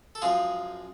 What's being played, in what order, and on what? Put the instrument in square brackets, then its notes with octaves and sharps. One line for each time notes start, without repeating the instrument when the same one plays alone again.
[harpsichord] A4
F#2 F3 G#3 F4 G#4